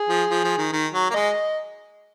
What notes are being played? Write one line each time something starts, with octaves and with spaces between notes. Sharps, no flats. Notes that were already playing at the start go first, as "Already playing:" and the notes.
Already playing: G#4
F3
F3
F3
D#3
D#3
F#3
A#3
G#3 D#5